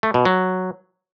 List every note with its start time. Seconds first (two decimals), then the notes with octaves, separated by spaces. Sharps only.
0.03 A3
0.14 B2
0.25 F#3